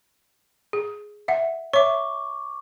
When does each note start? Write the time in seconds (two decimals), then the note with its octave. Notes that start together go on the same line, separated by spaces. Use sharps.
0.73 G#4
1.28 E5 F#5
1.73 C#5 E5 C#6 D6